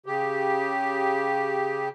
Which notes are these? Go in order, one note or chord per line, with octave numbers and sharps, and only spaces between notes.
C#3 G4